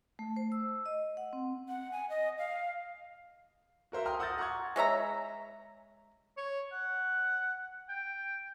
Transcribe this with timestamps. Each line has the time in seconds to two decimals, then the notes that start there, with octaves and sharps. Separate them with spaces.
0.19 A3
0.36 C5
0.52 E6
0.86 D#5
1.17 F#5
1.33 C4
1.69 F#5
1.92 G#5
2.10 D#5
2.38 F5
3.92 F#4 A#4 C5 E5
4.06 G5 A#5 C6 D#6 F6
4.19 F#5 D#6 E6 G6 A6 A#6
4.38 F#5 A#5 C6 C#6 G#6
4.76 G#3 C#5 E5 A#5
6.37 C#5
6.72 F#5
7.89 G5